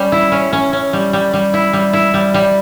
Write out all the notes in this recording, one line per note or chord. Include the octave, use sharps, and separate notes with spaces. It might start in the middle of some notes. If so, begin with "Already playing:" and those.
Already playing: G3 C#4
E4
C#4
C#4
C#4
G3
G3
G3
E4
G3
E4
G3
G3